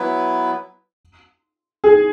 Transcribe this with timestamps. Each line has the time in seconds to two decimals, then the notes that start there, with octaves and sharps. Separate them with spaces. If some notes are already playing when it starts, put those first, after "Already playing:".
Already playing: F#3 B3 E4 B4
1.84 G#4